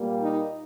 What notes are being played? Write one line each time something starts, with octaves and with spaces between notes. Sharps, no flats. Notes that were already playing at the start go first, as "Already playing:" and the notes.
Already playing: A#2 G3 A#3
D#4